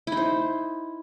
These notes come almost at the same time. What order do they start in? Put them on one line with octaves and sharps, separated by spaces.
E4 D#4 C5